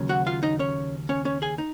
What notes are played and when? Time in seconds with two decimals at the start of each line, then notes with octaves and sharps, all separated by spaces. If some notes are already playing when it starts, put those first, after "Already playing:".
Already playing: D#2 C#3 F#3 C#4
0.09 F#4 F#5
0.26 F4 F5
0.43 D#4 D#5
0.59 C#4 C#5
1.09 C#4 C#5
1.25 C#4 C#5
1.42 G#4 G#5
1.58 D#4